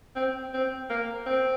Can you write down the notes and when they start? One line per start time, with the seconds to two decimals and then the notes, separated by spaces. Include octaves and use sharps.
0.16 C4
0.54 C4
0.90 A#3
1.26 C4